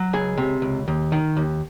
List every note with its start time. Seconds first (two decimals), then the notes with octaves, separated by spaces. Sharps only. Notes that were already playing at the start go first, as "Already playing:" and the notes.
Already playing: F#3
0.13 C#2 G#4
0.38 C3
0.62 C#2
0.88 D#2
1.12 D#3
1.37 D#2